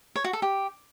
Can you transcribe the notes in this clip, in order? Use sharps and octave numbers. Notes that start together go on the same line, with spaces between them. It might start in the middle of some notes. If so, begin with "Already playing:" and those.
C#5
F#4
A4
G4